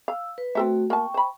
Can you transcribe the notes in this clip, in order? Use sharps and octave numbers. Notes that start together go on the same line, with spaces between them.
F5 E6
B4
A3 C4 F#4 A4 E5
A#3 G5 A5 C#6
C5 B5